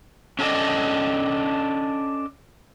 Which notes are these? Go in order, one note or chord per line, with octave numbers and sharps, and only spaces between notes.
C#4 D4 A4 B4 D5 D#5